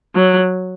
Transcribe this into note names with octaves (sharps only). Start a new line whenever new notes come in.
F#3